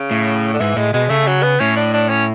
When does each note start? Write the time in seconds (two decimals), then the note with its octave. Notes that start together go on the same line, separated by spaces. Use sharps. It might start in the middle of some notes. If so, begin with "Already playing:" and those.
Already playing: C#3
0.11 A2
0.54 D3
0.60 G#2 E3
0.76 A2 G#3
0.94 B2 G#3
1.10 C#3 A3
1.27 F#3
1.43 B3
1.60 A2 C#4
1.76 D4
1.93 D4
2.10 C#4